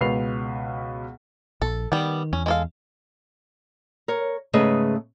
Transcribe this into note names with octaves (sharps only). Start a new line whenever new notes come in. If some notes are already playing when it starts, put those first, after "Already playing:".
C#2 B2 B4 C7 F7
A#1 A4
D#3 G3 B3
E2 C#4
G#3 A4 F5
A#4 C#5
G#2 C#3 A3 G#4 B4 D#5